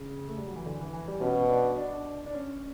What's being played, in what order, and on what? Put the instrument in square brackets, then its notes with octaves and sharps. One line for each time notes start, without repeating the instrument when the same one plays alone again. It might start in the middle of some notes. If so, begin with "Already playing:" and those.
Already playing: [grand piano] C#3
A3
G3
F#3
E3
D3
E3
E3
G3
[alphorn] B2 [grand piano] C#4
[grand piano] D4
D4
D4
C#4